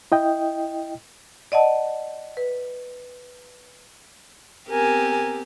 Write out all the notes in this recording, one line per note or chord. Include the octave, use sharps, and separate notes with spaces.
E4 D#5 G5
D5 D#5 F#5 A5
B4
B3 C4 G4 A#4 G#5